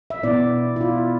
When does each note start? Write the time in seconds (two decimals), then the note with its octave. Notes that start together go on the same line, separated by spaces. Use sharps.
0.10 E5
0.23 B2 B3 E4 D5
0.76 E4
0.81 F4